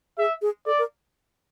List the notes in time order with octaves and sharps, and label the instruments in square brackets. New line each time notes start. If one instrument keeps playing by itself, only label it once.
[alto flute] G#4 [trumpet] E5
[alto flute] G#4
[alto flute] A4 [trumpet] D5
[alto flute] A#4